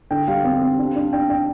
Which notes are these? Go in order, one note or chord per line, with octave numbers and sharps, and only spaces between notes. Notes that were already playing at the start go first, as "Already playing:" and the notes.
D3 G5
G3 F5
C4 F5
C4
D4
D4
D4 G5
D4 G5